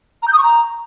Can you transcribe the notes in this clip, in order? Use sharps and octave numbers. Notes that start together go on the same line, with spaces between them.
A#5
G6
D#6
C#6
A#5